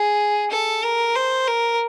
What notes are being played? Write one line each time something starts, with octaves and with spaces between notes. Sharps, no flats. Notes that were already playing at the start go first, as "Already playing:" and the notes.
Already playing: G#4
A4
A#4
C5
A#4